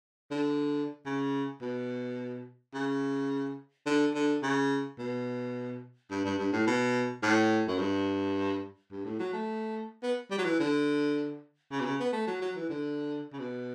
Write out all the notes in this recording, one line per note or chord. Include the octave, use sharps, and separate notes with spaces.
D3
C#3
B2
C#3
D3
D3
C#3
B2
G2
G2
G2
A2
B2
A2
F#2
G2
G2
A2
F#3
A3
B3
G3
F#3
E3
D3
C#3
B2
C#3
B3
A3
F#3
F#3
E3
D3
C#3
B2